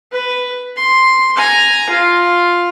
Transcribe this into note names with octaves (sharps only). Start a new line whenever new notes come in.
B4
C6
G#5 A#5
F4